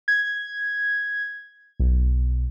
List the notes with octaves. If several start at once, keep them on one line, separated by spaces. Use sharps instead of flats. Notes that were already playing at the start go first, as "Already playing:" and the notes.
G#6
B1